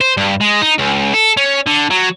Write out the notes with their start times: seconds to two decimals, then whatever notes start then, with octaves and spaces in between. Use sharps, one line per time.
0.01 C5
0.17 G2
0.41 G#3
0.62 D#4
0.78 C#2
1.14 A4
1.37 C#4
1.67 D3
1.91 F#3